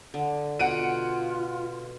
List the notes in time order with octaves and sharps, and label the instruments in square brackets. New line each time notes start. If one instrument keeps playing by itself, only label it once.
[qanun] D3
[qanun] B2 [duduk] F4 [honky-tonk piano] F#5 D7 D#7